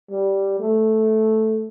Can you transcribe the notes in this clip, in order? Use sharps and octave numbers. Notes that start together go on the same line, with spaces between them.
G3
A3